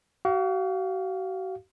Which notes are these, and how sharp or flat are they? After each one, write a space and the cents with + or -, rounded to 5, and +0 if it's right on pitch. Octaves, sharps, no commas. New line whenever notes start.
F#4 +40 F5 +0